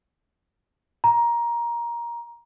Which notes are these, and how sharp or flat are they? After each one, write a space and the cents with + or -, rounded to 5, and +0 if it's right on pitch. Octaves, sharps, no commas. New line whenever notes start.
A#5 +15